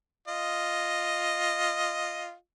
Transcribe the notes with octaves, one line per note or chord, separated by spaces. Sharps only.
F4 D#5